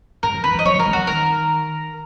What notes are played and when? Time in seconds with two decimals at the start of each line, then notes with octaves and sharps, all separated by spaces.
0.23 G#2 A#4
0.34 F2
0.44 D#3 B4
0.55 F3
0.59 D#5
0.65 F#3 C#5
0.76 F3
0.79 A#4
0.87 G#3
0.93 F#3 F#4
1.07 D#3 A#4